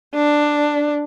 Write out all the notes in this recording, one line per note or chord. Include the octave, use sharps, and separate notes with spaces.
D4